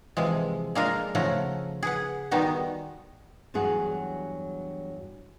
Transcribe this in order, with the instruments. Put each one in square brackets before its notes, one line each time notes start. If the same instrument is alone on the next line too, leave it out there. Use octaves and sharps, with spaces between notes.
[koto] C3 E3 F3 G#3
G#3 A#3 D4 F4 A4 A#4
C#3 F3 A3 A#4 F#5
G#4 B4 F#5
D#3 G3 G#3 B3 D#4 F#4
[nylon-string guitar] E2 G2 F#3 G#4 F#5